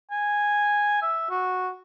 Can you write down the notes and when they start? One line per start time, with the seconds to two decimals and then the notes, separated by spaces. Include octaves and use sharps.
0.11 G#5
1.02 E5
1.30 F#4